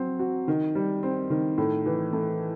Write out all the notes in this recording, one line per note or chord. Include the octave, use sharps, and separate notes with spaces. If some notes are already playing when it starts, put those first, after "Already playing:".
Already playing: F#3 C4
F#4
D#3
G3
C4
D#3
A2
E3
A3